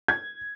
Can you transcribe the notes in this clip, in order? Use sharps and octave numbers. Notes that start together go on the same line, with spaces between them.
G#6